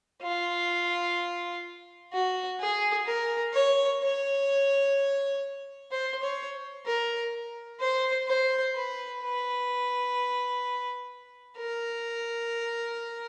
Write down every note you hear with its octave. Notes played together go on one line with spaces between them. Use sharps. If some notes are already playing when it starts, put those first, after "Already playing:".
F4
F#4
G#4
A#4
C#5
C#5
C5
C#5
A#4
C5
C5
B4
B4
A#4